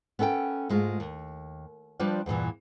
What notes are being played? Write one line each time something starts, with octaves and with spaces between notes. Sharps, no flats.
B3 C#4 A4 F#5 G5
G#2 G#3 A3 F4
D#2
F3 G3 D4 F4 B4 D5
E2 G2 A#2 E3